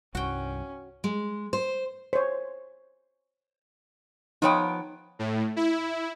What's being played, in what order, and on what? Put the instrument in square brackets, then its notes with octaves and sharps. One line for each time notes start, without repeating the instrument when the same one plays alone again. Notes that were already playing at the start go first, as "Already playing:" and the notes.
[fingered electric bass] C2 G2 [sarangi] C#4 [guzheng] F#4 G5
[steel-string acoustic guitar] G#3
C5
[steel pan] C5 C#5
[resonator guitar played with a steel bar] F3 B3 G5 [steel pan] D#4 C#5 D#6
[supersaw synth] A2
E4